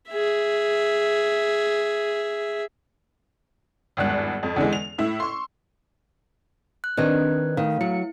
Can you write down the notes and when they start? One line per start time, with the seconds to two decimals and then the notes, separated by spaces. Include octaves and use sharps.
0.10 G#4 E5
3.97 G#1 E2 G2 F#6
4.43 F2
4.56 E2 D3 E3 G#3
4.73 F7
4.98 A2 E4 E6
5.20 C6 C#6
6.84 F#6
6.97 D#3 C4 D4 B4 D#5 F#6 G#6
7.57 D#3 A3 F5
7.81 F#3 E4 C#7